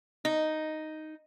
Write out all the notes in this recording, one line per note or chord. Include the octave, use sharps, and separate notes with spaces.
D#4